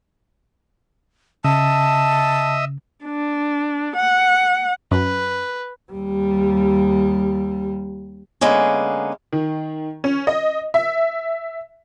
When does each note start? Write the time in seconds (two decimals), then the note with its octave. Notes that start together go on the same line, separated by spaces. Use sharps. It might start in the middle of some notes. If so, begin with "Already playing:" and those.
1.45 C#3 D#5 E5 A5
3.05 D4
3.96 F#5
4.91 F#2 B4
5.92 D#2 G3
8.41 D3 G#3 A#3 B3 C#4
9.32 D#3
10.04 C#4
10.27 D#5
10.74 E5